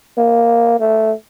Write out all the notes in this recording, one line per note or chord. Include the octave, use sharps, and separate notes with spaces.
A#3
A3